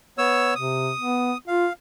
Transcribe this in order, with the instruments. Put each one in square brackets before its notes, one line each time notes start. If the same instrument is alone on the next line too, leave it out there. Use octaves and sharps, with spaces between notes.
[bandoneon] B3 C#5 E6
[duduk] C3 [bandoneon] D#6
[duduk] B3
[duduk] F4 [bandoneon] F5